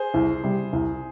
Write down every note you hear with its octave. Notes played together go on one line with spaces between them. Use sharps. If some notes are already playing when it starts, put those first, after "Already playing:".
Already playing: G#4 C5
C2
C3 G3
C2